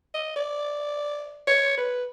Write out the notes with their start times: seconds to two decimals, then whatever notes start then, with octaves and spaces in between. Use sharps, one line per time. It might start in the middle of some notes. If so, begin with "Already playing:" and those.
0.14 D#5
0.36 D5
1.47 C#5
1.78 B4